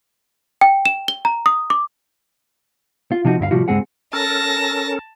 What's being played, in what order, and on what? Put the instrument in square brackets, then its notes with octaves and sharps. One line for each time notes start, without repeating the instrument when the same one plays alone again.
[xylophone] G5
E7
G7
A#5
D#6
D6
[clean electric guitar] F4
C3 F3 D#4 F4 F#4
D2 G2 E4 F5
A2 C3 F3 G3 F4 F#4
C#2 G2 G#3 C4 G#4 F#5
[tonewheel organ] C#4 A4 A#4 [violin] A5 A#6